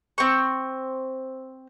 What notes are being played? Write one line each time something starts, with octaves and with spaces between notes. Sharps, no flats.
C4 C#6